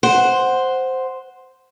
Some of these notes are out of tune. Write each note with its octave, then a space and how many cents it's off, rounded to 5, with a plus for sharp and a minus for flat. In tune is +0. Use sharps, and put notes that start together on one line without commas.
C5 +0 F#5 +0